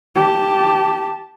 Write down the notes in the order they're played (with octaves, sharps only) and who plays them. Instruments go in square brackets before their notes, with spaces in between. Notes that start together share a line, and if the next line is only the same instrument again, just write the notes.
[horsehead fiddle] G4 A5